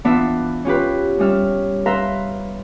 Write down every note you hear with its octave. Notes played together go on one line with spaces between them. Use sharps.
E3 B3 D4 F4 E5
C#4 F4 G4 B4
G3 C#4 E5 F6
B4 E5 F5 A#5 C6